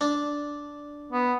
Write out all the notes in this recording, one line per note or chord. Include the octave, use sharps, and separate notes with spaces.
D4
B3